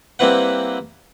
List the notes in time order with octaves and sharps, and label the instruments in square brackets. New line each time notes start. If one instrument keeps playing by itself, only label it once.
[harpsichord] G3 A#3 C4 E4 B4 F#5